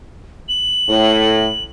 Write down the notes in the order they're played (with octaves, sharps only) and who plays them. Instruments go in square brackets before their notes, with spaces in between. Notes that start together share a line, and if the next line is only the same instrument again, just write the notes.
[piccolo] F#7
[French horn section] A2